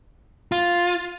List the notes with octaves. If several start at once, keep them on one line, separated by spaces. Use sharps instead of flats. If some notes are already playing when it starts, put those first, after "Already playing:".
F4